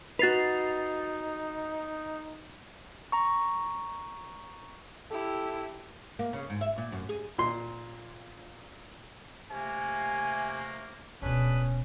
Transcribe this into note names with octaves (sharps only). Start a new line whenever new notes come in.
D#4 F#4 B4 A6 C7 F7
A#5 C#6
E4 G4 A4
A#3
C#3
G#2
E5
A#2
F#2
G#4
A#2 C6
C3 A3 A#3 G#5
D1 B2 C#4 D4 G#4 B4